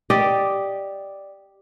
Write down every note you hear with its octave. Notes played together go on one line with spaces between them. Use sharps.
G4 D5 D#5